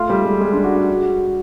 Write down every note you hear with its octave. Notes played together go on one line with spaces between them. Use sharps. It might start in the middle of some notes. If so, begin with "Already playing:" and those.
Already playing: A3 F4
G3
G#3
G#3
D4
F#4
F#4
F#4